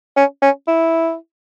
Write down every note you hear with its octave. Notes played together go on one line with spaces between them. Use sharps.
C#4
C#4
E4